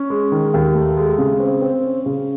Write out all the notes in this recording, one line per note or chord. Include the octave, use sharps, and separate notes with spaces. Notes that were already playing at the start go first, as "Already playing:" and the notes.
Already playing: C#4
G#3
D#3
D#2
A3
G#3
C#3
C4
C4
C#4
C#3